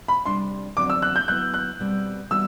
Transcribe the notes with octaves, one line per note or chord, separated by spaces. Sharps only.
B5
C3 G3 D4 G4 C6
E2 D3 F#3 C4 F#4 D6
E6
F#6
G6
F#3 B3 E4 B4 F#6
F#6
B2 G3 C4
E3 G3 B3 F#4 E6